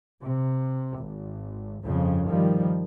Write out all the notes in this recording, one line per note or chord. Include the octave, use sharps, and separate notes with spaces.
C3
G#1
G1 F2 C#3
D#3 F3 G3